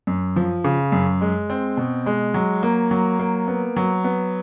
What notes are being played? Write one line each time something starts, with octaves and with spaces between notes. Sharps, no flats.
F#2
F3
C#3
F#2
G#3
C4
B2
G#3
F#3
A#3
F#3
A#3
B3
F#3
B3